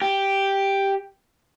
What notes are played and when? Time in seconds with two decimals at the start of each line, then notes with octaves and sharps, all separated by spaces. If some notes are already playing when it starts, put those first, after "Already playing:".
0.02 G4